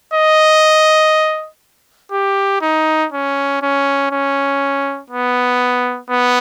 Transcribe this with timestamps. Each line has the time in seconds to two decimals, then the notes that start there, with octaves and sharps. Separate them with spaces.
0.14 D#5
2.12 G4
2.62 D#4
3.13 C#4
3.62 C#4
4.12 C#4
5.10 B3
6.10 B3